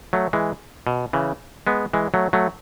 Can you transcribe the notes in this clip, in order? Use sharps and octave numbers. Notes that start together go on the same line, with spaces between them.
F#3 A3
E3 G#3
B2
C#3 E3
G#3 B3
E3 G#3
F#3 A3
F#3 A3